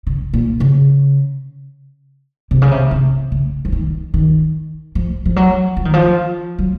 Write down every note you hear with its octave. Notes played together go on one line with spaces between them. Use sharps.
C#3
A#2
C#3
C3
C#3
C3
C3
C#3
F3
D#3
D#3
F3
F3
F#3
F3
D#3
F3
F#3